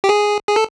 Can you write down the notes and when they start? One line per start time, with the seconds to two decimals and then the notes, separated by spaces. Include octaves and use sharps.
0.04 G4
0.09 G#4
0.48 G#4
0.56 A4